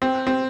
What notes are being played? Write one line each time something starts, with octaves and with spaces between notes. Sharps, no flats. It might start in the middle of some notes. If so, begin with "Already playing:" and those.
C4
C4